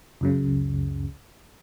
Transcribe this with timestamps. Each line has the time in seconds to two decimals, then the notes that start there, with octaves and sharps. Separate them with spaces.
0.21 C#2 F#2 C#3